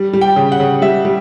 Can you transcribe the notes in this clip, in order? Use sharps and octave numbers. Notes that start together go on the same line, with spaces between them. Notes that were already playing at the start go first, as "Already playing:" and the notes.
Already playing: G3
G3
G5
C#3
F#5
C#3
G3 E5
G3